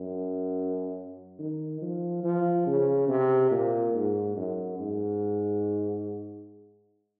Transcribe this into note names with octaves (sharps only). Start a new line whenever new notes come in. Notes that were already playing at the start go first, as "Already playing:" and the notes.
Already playing: F#2
D#3
F3
F3
C#3
C3
A#2
G#2
F#2
G#2